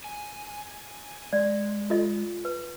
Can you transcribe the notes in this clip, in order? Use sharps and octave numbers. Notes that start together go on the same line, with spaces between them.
G#5
G#3 D5
F4 A4 D#5
B4